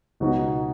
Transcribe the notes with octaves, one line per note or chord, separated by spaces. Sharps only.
C#2 B2 F#3 D#4 F#4